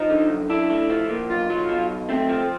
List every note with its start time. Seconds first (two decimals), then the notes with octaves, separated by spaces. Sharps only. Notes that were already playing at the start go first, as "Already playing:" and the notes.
Already playing: F3 D#4
0.10 D3
0.29 F#2
0.49 D4 E4
0.70 A3
0.90 F3
1.09 A#2
1.30 B1 F4
1.50 F#3
1.69 B2
1.89 B1
2.09 A3 C4
2.29 F3